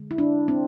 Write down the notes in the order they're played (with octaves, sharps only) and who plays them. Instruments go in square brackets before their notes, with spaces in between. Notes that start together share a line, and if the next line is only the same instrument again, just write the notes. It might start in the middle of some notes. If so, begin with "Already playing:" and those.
Already playing: [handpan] D3 G#3
E4
D4
C4